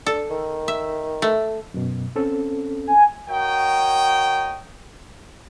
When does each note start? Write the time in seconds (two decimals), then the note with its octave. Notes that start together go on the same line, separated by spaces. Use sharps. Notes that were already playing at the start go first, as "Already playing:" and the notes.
0.06 D4 A4
0.30 D#3
0.68 E5
1.22 A3
1.74 F#2 B2
2.16 C4 C#4 A4
2.87 G#5
3.28 F#4 A#4 C#5 D#5 G5